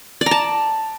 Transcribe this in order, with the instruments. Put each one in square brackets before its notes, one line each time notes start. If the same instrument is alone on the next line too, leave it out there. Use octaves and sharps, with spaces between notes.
[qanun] D5
A#5
A5